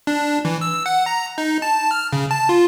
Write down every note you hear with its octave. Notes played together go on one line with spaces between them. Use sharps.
D4
E3
E6
F#5
A#5
D#4
A5
F6
C#3
A5
F4